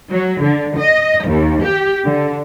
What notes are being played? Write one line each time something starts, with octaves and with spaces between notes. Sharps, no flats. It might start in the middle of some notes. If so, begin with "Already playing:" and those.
F#3
D3
D#5
D#2
G4
D3